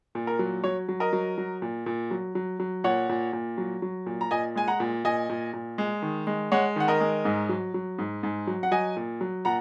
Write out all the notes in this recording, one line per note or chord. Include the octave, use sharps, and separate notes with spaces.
A#2
A#4
F#3
F#3 C#5
F#3
A#4 D#5
F#3
F#3
A#2
A#2
F#3
F#3
F#3
A#2 C#5 F#5
A#2
A#2
F#3
F#3
A#2
A#5
A#2 D#5 G#5
G#3 G#5
F#5 A#5
A#2
A#2 D#5 G#5
A#2
A#2
G#3
D#3
G#3
G#3 C#5 F#5
D#3 F#5
A#4 D#5
G#3
G#2
F#3
F#3
G#2
G#2
F#3
F#5
F#3 D#5 G#5
A#2
F#3
A#2 F#5 A#5